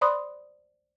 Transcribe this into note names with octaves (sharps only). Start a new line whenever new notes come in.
C5 D5 B5 C6 D#6 F#6